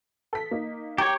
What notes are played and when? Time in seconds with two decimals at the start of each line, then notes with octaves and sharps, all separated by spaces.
0.33 A4 B6
0.51 A#3 D#4
0.98 G4 C#5 A#5